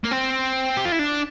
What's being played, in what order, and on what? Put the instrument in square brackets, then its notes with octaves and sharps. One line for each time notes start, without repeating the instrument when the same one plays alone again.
[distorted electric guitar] A#3
C4
G4
F4
E4
D4